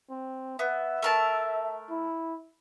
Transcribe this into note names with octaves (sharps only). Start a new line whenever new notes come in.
C4
B3 E5
A3 A#4 A5
E4